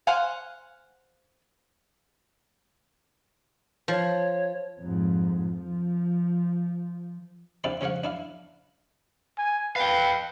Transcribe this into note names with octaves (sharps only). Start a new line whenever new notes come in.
C5 F5 F#5 G#5
F3 C#5
F2 G#2
F3
C3 D4 E4 F4 D5
C#3 F3 C#5 F5 F#5
D4 E4 F5
G#5
B4 F5 G5